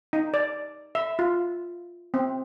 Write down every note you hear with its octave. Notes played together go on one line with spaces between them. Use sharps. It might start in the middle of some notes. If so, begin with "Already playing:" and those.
D#4
D5
E5
F4
C4